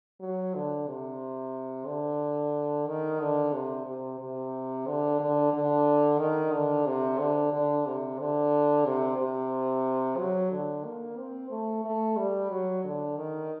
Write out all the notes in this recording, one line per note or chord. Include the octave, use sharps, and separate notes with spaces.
F#3
D3
C3
D3
D#3
D3
C3
C3
C3
D3
D3
D3
D#3
D3
C3
D3
D3
C3
D3
C3
C3
F#3
D3
A#3
C4
A3
A3
G3
F#3
D3
D#3